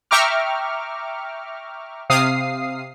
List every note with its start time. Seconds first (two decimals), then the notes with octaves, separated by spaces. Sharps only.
0.11 E5 G5 A#5 C#6 D6 F6
2.10 C3 F5 D#6 C7